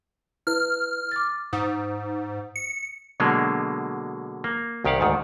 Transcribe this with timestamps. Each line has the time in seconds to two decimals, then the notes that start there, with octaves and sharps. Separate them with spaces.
0.47 E4 B4 F6
1.12 D6 A6
1.53 G#2 D#6
2.56 C#7
3.20 B2 D3 F#3 G#3 A#3 D4
4.44 A#3
4.85 C2 D#3 G4 F5 F#5
5.00 D2 G#2 D#3